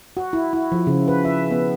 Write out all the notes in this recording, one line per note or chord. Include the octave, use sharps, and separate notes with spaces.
F#4
E4
E4
F3
C#3
B4
E5
B3